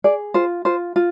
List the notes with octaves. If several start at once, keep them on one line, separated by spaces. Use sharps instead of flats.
G#4 D5
F4 C5
F4 C5
F4